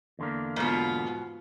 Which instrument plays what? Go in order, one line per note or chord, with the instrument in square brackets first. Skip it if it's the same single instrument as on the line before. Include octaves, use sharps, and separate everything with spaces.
[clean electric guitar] E2 D3 A#3
[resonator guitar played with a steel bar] G#2 B2 [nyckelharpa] B3 F4